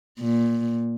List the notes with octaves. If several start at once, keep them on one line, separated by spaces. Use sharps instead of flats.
A#2